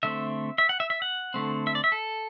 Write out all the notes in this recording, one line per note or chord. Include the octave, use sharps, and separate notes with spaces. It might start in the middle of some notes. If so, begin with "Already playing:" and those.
D3 A3 C4 E5
E5
F#5
E5
E5
F#5
D3 A3 C4
E5
D5
E5
A4